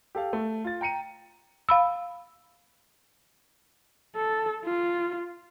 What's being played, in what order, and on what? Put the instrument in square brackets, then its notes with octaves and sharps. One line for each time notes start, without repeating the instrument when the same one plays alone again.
[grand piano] G4 A4 F5
A3
F4 A6
G5 A#5 C#7 D#7
[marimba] F5 B5 E6
[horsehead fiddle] A4
F4